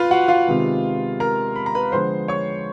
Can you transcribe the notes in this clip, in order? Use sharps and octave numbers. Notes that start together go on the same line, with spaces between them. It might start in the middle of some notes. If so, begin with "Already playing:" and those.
Already playing: F4 B4 F5 B5
F#4 F#5
F4 F5
C3 D#3 G#3 B3
A#4 A#5
B5
A#5
B4 B5
D3 F3 G#3 B3 C5 C6
C#5 C#6